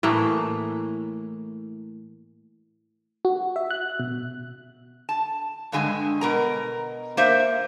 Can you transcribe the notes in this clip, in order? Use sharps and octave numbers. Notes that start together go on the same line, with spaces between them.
A2 E3 A3 A#3
F#4
E5
F#6
B2
A5
G2 D3 G#3 G#5
B2 A#4 A#5
A#3 A#4 C5 E5